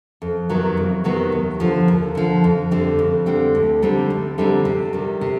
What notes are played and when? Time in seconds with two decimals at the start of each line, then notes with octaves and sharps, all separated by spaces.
0.22 F2
0.49 C3 D#3 F#3 B3
0.77 F2
1.04 C3 D#3 F#3 B3
1.32 D#2
1.60 D3 F3
1.88 D#2
2.15 D3 F3
2.44 F2
2.71 D3 G3 C4
2.99 F2
3.26 D3 G3 C4
3.55 D2
3.82 D3 G3 C4 D#4
4.10 D2
4.38 D3 G3 C4 D#4
4.65 C3
4.93 D#3 G3
5.21 C3